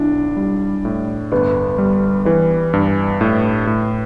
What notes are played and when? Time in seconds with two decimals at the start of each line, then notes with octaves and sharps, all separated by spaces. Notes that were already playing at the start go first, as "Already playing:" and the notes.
Already playing: B1 D4 E4
0.37 G3
0.85 A2
1.32 G1 B3
1.78 G3
2.25 E3 B3
2.73 G2
3.21 A2
3.67 A2